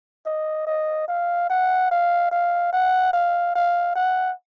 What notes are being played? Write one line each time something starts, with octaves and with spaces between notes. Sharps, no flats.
D#5
D#5
F5
F#5
F5
F5
F#5
F5
F5
F#5